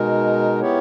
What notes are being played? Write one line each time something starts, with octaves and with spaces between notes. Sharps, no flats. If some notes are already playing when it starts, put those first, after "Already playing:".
Already playing: B2 G#3 D#4 A#4
B3 E4 G4 C#5